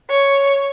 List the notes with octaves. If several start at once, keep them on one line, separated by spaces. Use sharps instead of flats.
C#5